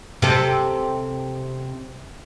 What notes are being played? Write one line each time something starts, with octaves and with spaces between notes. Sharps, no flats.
C3 A4